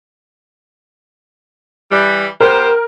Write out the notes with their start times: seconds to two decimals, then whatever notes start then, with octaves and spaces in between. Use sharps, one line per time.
1.91 E3 G3
2.41 B3 G4 A#4 C5